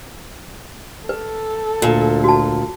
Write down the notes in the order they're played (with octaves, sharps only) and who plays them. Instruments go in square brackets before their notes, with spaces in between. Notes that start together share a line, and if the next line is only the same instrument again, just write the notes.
[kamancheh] A4 [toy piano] B4
[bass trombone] D2 [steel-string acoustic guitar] A#2
[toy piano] F#4 A5